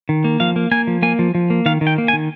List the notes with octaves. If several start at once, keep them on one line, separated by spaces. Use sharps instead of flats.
D#3
A#3
F3 F5
A#3
A#3 G#5
F3
A#3 G#5
F3
F3
A#3
D#3 F5
D#3
G5
A#3
G#5
D#3